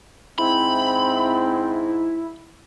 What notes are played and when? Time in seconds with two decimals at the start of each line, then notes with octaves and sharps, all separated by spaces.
0.38 G#2 C4 E4 B5